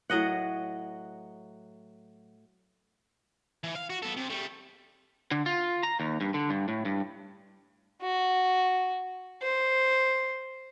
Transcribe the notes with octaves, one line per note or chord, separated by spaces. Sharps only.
A2 F#3 D#5 F#5
E3
F5
F#4
B3 A4
C3
G3 A3
D3
F4
A#5
D#2
G2
D3
G2
A2
G2
F#4
C5